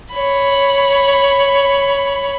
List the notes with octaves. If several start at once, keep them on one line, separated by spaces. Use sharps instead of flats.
C#5 B5